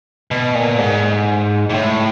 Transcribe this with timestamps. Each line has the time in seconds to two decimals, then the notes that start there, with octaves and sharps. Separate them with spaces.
0.31 B2
0.55 A#2
0.78 G#2
1.70 G#2
1.74 A2